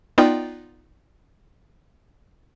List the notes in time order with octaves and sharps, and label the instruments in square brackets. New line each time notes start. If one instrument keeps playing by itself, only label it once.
[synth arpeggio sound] B3 D#4 F4 D5 G5